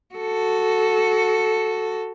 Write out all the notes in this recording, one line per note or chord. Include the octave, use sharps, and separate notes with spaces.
F#4 A4